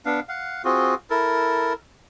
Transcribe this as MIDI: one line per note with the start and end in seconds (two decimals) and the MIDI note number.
0.06 0.20 59
0.06 0.20 62
0.06 0.20 77
0.29 0.62 77
0.29 0.62 78
0.65 0.94 60
0.65 0.94 65
0.65 0.94 66
0.65 0.94 68
1.10 1.73 64
1.10 1.73 69
1.10 1.73 70